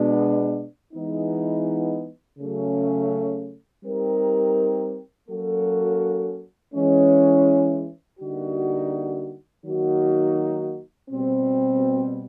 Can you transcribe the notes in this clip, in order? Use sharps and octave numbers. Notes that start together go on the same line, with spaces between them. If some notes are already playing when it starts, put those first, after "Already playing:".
Already playing: B2 G#3 B3 D4
E3 G#3 B3 D#4
C#3 F#3 A3 C#4
G3 C4 D#4 G4 A#4
F#3 A#3 C#4 F#4 A4
E3 G#3 C#4
D3 G3 A#3 D#4 F#4
D#3 F#3 A#3 D#4 F#4
B2 G3 C4